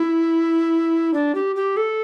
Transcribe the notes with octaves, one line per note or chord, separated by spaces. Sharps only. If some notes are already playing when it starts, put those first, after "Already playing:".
Already playing: E4
D4
G4
G4
A4